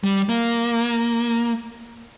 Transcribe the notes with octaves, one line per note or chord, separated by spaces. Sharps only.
G3
A#3